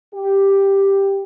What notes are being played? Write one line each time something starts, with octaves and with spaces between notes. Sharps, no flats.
G4